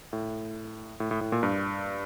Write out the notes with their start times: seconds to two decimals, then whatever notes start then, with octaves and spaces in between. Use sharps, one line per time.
0.13 A2
1.00 A2
1.11 A2
1.21 A2
1.32 A#2
1.43 G2